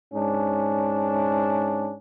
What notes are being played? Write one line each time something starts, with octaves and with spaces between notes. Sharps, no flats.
G#2 C#4 D4